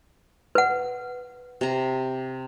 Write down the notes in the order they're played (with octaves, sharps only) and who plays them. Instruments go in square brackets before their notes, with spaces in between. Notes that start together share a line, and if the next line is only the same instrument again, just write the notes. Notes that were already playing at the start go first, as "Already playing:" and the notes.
[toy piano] B4 F#5
[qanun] C3 A#5